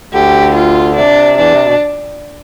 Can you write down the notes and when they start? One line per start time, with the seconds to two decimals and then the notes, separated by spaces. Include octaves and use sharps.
0.13 D2 D3 G4
0.55 F4
0.96 C3 D4
1.38 E2 E3 D4
1.52 C3
1.65 B2